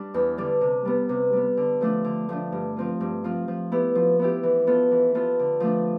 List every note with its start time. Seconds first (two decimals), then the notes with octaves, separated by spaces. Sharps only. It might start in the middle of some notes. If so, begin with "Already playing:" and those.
Already playing: G3 D4
0.14 E2
0.38 D3 G3 D4
0.61 C3
0.85 G3 B3
1.09 C3
1.33 G3 B3
1.57 D3
1.81 F3 A3 D4
2.04 D3
2.29 F3 A3 D4
2.52 G2
2.77 F3 C4 F4
3.01 G2
3.24 F3 C4 F4
3.48 F3
3.72 B3 E4 G4
3.95 F3
4.19 B3 E4 G4
4.43 E3
4.67 B3 F4 A4
4.91 E3
5.15 B3 F4 A4
5.39 D3
5.60 F3 A3 D4